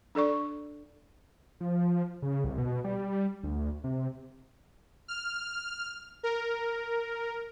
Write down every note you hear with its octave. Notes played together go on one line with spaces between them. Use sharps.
D4 A4 D5 C#6
F3
C#3
C2
B2
G3
D2
C3
F6
A#4